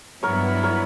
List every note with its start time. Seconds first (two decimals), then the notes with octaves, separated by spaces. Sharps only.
0.23 G2 F#3 B3 E4 A#4 C#5
0.63 A#4 C#5